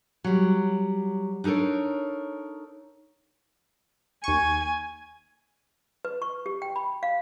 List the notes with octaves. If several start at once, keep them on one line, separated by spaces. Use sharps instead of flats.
F#3 G3
D4 D#4 A4 A#4 C#5
D#2 G#5 C#6
B4
C#6
G4
G5
B5
F5